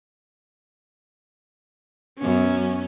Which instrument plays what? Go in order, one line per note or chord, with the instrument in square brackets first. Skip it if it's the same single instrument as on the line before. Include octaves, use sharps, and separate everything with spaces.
[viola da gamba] F#2 B3 [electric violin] C#4